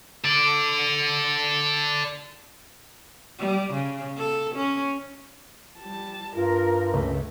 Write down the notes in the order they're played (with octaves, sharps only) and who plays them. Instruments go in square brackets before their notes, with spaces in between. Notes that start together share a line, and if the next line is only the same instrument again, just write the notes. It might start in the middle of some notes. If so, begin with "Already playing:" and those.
[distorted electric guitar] A4 D5
[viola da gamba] G3
C#3
A4
C#4
[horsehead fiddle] G3 A5
[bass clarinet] G2 [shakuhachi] F4 [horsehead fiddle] A#4
[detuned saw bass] C#2 [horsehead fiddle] A3